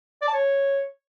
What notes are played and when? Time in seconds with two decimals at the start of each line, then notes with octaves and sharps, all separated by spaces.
0.22 D5
0.28 A5
0.34 C#5